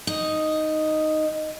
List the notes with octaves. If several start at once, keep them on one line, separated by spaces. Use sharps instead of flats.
D#4